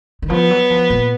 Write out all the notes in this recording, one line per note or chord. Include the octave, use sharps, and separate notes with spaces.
D#3
F3 B3
F#3
F3
A#2